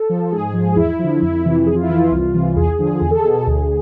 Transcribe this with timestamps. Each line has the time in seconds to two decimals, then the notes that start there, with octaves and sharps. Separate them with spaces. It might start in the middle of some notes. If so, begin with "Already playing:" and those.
Already playing: A4
0.09 F3
0.32 G#2 G#4
0.54 F3
0.76 E2 E4
0.99 D3 F3
1.22 F2 E4
1.45 C3 E3
1.66 F2 G#4
1.76 F4
1.83 E4
1.89 E3 F4
2.12 C2
2.34 C3 E3
2.56 E2 G#4
2.79 D3 F3
3.01 E2 G#4
3.11 A4
3.19 G#4
3.25 B2
3.47 D2